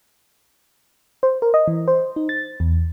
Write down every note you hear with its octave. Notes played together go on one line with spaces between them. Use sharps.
C5
A#4
D#5
E3
C5
D#4
A6
E2